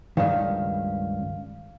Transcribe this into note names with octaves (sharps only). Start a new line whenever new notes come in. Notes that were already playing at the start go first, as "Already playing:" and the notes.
C#2 G2 D#3 F5